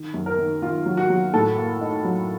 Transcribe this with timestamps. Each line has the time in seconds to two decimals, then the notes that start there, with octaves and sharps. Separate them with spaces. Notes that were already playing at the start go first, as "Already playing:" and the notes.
Already playing: D#3
0.14 F#2
0.26 A#4
0.38 D#3
0.62 D#3 F4
0.86 F#3
0.97 F#4
1.09 F#3
1.34 A2 A4
1.57 A#3
1.81 D#4
2.04 F#3